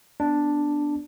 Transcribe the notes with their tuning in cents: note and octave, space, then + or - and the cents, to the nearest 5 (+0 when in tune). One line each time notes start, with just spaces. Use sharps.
B3 +0 D4 +0